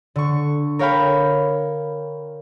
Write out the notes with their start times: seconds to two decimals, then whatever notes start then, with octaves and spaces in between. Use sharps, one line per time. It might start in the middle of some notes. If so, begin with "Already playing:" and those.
0.16 D3 C#6
0.79 A#4 C#5 F5 G5 B5